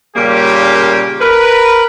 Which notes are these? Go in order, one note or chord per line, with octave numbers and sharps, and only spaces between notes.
A#2 C#3 G3 A#3 C#4 G4
A#4 B4